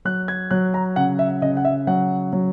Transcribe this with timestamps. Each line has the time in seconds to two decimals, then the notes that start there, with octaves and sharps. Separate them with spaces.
0.05 F#3 F#6
0.28 G#6
0.51 F#3 F#6
0.74 A#5
0.96 C#3 F#5
1.19 E5
1.41 C#3 D#5
1.57 F#5
1.65 E5
1.87 F#3 F#5
2.33 F#3